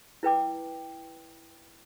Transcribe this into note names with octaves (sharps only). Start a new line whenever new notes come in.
E4 B4 G5 D6